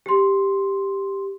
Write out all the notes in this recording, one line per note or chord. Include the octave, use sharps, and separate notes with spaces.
G4 C6